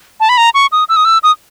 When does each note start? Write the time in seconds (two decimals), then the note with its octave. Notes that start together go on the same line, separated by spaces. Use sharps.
0.20 A5
0.29 B5
0.37 A#5
0.54 C#6
0.72 D#6
0.89 E6
0.96 D#6
1.05 E6
1.23 D#6